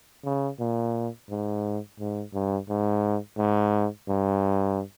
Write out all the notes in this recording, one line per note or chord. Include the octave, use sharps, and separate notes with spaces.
C#3
A#2
G#2
G#2
G2
G#2
G#2
G2